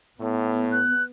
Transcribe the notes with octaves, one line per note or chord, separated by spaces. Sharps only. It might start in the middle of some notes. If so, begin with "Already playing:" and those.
A2 B3
F#6